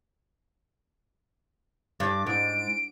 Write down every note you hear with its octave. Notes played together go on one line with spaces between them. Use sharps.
G2 D6
G#2 D7